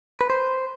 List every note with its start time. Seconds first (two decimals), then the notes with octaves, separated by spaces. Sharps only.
0.21 B4
0.30 C5